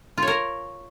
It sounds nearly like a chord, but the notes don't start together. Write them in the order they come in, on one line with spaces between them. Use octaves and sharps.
F4 C#5 A#4